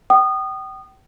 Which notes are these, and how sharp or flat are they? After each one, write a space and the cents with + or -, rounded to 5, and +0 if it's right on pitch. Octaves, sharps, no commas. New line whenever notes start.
G5 -35 D#6 -25